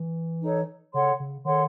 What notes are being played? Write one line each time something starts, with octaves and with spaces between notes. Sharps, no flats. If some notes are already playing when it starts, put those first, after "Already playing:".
Already playing: E3
D#4 A4 C#5
C#3 A4 C#5 F#5 C6
C#3
D#3 A4 C#5 F#5 C6